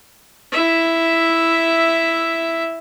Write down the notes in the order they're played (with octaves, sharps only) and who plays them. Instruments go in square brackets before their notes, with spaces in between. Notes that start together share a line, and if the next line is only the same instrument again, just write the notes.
[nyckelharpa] E4 E5